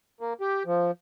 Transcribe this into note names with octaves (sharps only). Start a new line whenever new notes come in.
A#3
G4
F3